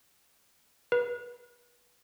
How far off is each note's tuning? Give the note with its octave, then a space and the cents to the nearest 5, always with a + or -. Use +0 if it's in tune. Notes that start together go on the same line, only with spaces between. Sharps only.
B4 -30